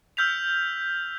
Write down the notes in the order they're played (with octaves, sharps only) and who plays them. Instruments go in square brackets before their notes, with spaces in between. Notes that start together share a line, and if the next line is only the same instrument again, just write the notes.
[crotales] E6 F6 G6 B6 F7